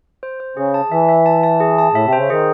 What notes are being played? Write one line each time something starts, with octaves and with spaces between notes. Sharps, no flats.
C5
C5
C#3 G#4
A5
E3 E5
E5
A5
A5
G#4
A5
A2 E5
C3
C#3 C5
D#3 G#4